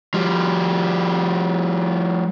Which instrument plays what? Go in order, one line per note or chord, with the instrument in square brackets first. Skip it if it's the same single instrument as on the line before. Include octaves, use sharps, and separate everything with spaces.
[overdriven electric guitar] F3 G3